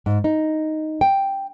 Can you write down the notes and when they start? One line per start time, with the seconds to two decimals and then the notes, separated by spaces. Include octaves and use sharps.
0.06 G#2
0.24 D#4
1.01 G5